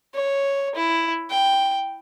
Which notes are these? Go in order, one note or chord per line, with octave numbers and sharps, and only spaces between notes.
C#5
E4
G5